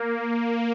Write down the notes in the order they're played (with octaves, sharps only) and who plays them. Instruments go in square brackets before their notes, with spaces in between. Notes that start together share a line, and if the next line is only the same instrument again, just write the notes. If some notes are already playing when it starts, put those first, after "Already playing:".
Already playing: [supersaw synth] A#3